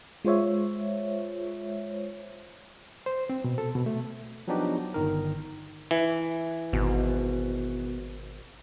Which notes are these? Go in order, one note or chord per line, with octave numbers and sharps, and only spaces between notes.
G#3 F4 C5 C#5 E5
C5
C4
B2
A4
B2
A3
F3 F#3 B3 D4 D#4 G4
G1 D#3 A#4
E3
G#1 B2